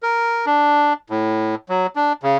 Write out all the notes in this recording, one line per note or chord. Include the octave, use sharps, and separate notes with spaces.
A#4
D4
A2
F#3
D4
C#3